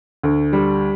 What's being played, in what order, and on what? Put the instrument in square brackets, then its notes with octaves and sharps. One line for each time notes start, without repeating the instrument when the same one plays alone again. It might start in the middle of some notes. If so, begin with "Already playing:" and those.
[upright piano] D2
G3